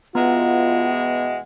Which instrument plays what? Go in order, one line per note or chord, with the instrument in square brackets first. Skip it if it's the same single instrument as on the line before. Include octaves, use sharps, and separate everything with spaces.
[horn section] B2 E3 G#3 [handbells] B3 A#5 [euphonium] F4 [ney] F#5